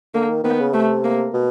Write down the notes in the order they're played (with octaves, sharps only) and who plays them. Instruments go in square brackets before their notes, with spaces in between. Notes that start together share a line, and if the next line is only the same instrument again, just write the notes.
[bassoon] D3 [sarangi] A#3
[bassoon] D#3
[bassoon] D#3 [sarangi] B3
[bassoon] C#3
[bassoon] C3 [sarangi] A3
[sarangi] A#3
[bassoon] B2